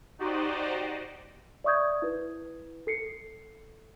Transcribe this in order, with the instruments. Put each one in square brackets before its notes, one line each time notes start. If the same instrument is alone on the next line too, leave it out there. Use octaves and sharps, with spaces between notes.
[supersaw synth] D#4 F#4 G4 C5 D5 D#5
[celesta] D5 E5 C#6 D#6 G6 G#6
E4 B4
A4 C7 C#7